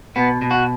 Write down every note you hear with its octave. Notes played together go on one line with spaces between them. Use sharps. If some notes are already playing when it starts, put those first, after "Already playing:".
B2 B3
B2
F#4